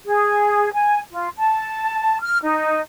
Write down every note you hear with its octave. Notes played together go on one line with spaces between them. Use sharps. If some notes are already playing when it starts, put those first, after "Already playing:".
G#4
G#5
F4
A5
F6
D#4